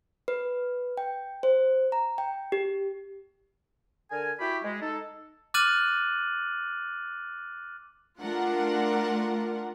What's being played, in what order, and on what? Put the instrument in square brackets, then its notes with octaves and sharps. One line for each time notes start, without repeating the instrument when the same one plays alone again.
[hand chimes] B4
G5
C5
A#5
G5
G4
[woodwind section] D3 A#4 G#5
E4 F#4 G4 G5 B5
G#3
D#4 A4
[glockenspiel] D6 F6 F#6 A6 D#7 F#7
[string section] A3 D4 F4 A#4 F#5